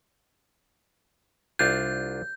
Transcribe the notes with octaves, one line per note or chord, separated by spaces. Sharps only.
C2 D4 F4 G6